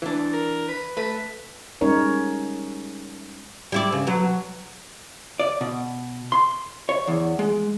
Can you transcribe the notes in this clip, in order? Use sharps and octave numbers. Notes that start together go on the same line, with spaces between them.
E3 D4
A#4
B4
A3 B4
G3 G#3 C#4 D#4 A#4 C#5
G3 E4 D5
C#3
B2 F#3
D5
B2
C6
C#5
E2
G#3